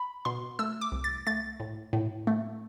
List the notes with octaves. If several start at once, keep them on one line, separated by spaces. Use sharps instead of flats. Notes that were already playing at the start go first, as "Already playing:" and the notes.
Already playing: B5
B2 C6
A3 E6
D6
C2
A6
A3 A6
A2
A2
A3